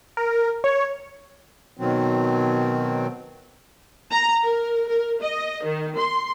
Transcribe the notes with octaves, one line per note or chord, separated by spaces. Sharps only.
A#4
C#5
B2 D#3 F#3 C4
A#5
A#4
A#4
D#5
D#3
C6